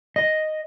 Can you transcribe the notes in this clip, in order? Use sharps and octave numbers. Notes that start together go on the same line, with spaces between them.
D#5